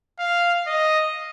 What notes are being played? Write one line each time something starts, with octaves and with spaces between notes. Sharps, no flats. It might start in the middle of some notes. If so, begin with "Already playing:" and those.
F5
D#5